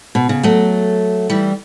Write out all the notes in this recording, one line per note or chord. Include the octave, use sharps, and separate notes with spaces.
B2
C#3
F#3 A3
E3 G3